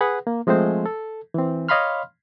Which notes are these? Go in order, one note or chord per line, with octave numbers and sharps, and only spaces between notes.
G#4 B4 F#5
A#3
F3 G#3 A3 C4 C5
A4
E3 C4
C#5 D#5 F5 B5 C6 F6